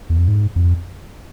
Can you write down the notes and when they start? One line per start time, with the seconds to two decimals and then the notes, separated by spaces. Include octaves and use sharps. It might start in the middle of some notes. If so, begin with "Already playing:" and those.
0.10 E2
0.18 F2
0.28 G#2
0.56 F2